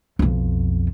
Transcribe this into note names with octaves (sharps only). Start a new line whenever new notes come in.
B1 F2